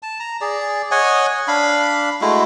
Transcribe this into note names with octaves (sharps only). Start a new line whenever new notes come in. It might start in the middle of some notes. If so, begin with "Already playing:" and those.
A5
A#5
G#4 D5
C#5 D#5 F#5 G#5
D4 F5 B5
G#3 A3 E4 F#4